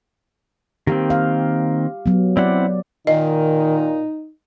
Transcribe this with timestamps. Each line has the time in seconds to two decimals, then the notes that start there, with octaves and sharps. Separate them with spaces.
0.87 D#3 A#3 C4 G4
1.10 F5
2.06 F#3 B3
2.37 C4 E4 D5 F#5
3.07 A#2 D#3 D#4 D#5